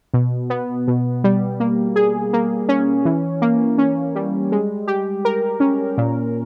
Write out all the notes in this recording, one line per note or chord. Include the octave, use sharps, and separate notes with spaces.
B2
B3
B2
G3
A#3
G#4
A#3
C#4
E3
A#3
C#4
G3
G#3
G4
A#4
C#4
A#2